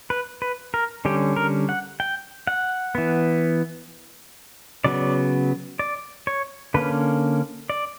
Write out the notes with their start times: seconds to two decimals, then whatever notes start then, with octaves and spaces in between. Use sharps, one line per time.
0.10 B4
0.42 B4
0.74 A#4
1.05 D3 G3 C#4 G4
1.36 A#4
1.69 F#5
2.00 G5
2.47 F#5
2.95 E3 B3
4.84 C#3 F#3 B3 D5
5.79 D5
6.27 C#5
6.74 D3 A#3 C#4 B4
7.70 D5